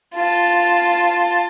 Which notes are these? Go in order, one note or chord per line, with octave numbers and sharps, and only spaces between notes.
F4 A5